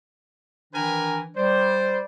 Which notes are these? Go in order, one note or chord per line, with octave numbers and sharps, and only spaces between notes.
D#3 E3 D4 A#4 B4 G#5
G3 C5 D5